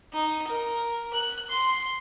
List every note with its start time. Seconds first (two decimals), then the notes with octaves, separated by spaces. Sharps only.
0.13 D#4
0.47 A#4
1.13 F#6
1.50 C6